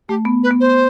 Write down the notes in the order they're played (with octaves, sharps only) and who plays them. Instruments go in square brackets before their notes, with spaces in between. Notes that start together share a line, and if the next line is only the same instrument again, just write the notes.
[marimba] A3 [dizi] G4
[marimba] B3
[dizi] B4
[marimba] B3
[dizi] C5